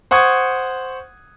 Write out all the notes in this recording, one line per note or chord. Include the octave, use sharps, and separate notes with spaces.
C5 F#5 C#6 D#6 G#6